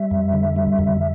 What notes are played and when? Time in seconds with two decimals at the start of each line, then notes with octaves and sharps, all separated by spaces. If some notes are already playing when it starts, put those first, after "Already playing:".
Already playing: G3 E5
0.11 F2
0.33 D3
0.56 G3
0.79 F2